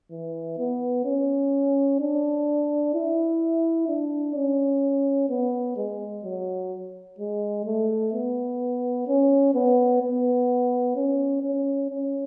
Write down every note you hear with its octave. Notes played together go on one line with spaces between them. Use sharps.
E3
B3
C#4
D4
E4
D4
C#4
B3
G#3
F#3
G#3
A3
B3
C#4
B3
B3
C#4
C#4
C#4